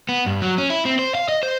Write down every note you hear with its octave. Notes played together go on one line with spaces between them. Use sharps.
B3
G2
F#3
C#4
E4
C4
C5
F5
D#5
C5